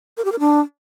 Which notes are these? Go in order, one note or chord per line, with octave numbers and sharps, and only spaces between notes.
A#4
G4
A#4
D4